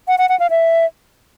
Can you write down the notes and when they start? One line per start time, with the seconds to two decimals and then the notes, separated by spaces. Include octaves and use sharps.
0.08 F#5
0.18 F#5
0.29 F#5
0.40 F5
0.50 E5